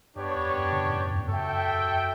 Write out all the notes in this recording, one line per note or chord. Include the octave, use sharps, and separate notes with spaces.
F#2 B3 D4 G4 C#5
E2
F#2
A2 C#3
F#2 A2
E2 G2
F#4 A4 E5 G5
F#2
E2
F#2